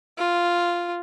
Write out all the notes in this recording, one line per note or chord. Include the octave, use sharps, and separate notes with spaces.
F4